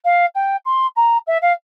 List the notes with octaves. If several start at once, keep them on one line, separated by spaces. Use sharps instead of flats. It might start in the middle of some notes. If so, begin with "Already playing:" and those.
F5
G5
C6
A#5
E5
F5